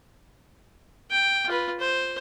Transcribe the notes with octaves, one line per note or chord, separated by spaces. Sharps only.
G5
F4 B4
C5